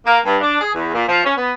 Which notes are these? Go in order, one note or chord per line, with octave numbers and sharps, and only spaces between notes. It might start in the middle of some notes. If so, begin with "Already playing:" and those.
A#3
G2
D4
G#4
E2
A#2
F3
C#4
B3